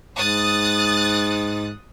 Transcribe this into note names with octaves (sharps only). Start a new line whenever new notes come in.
G#2 D#6 F#6 A6